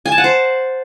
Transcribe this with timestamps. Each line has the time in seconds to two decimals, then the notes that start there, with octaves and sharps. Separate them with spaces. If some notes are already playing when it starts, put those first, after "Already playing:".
0.06 G#5
0.12 A5
0.18 F#5
0.24 C5